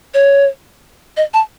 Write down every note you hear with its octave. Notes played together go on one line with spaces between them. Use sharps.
C#5
D#5
A5